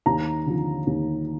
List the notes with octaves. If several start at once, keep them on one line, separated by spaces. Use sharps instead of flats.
D#2 A#5
D3 F3
D#2